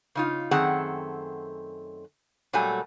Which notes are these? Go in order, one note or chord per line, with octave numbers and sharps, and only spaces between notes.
C#3 D#4 F4
F#2 D#3 A3 C4 G#4 F#5
A#2 F#3 G3 A3 G#5